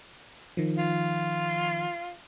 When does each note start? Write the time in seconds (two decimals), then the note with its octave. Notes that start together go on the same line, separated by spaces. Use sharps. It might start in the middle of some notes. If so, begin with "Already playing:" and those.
0.57 D#3 F3
0.78 F4